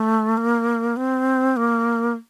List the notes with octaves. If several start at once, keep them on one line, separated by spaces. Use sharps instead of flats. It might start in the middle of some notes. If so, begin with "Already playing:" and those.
Already playing: A3
A#3
C4
A#3